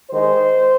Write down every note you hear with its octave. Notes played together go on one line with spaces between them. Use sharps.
D#3 G#3 D#4 C5